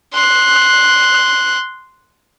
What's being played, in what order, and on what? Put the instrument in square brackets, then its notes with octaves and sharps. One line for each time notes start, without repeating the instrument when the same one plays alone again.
[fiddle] C6 F#6